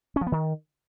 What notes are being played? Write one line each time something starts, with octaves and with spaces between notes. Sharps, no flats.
C#4
F3
B3
D#3